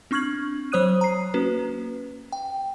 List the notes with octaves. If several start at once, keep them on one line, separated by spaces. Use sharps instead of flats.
C4 D4 C#6 F6 G#6 F#7
F#3 C5 C#5 D#6 F#6 D#7
A#5 C7
A#3 C#4 F#4 B4
G5